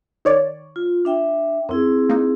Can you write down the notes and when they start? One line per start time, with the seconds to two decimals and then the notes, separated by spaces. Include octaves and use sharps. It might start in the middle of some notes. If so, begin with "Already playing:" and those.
0.25 D#3 C#5 D5
0.76 F4
1.05 D4 E5 G5
1.69 F#2 C4 E4 G#4
2.09 A#3 D#4